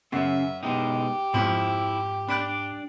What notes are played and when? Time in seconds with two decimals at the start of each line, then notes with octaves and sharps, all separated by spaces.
0.12 F#2 C#3 E5
0.63 B2 G#3 D#4 G4
1.34 F2 G#2 F3 E4
2.28 D4 D5 B5 F#6